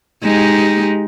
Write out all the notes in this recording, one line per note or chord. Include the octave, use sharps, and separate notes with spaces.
G#3 D#4 G4